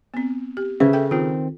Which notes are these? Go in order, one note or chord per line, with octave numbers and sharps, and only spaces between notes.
B3 C4
G4
C#3 B4 C5 E5
A4 G5
D#3 C4 F4